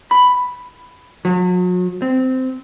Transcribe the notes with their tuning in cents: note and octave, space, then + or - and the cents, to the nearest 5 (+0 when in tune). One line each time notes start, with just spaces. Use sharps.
B5 +5
F#3 -40
C4 -15